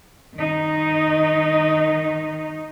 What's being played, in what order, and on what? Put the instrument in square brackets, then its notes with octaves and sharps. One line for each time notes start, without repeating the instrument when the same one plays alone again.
[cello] D#3 D#4